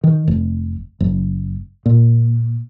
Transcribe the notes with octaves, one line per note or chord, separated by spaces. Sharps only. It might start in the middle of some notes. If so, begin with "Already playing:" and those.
D#3
F1
F#1
A#2